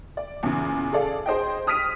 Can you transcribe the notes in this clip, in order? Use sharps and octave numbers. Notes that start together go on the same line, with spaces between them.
D5
E2 A#2 C#3
G#4 A4 D5 F5
G#4 C5 D#5 G5
D#6 F6 B6 D#7